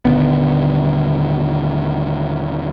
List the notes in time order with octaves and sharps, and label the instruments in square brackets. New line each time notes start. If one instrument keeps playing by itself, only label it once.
[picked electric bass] D#1 D3 B3